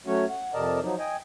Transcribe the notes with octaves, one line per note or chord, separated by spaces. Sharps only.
F#3 A3 C#4 F#4 C#5
F#5
F2 C3 A#4 D5 D#5 A5
F3 F#3 D#4
D#5 G5 G#5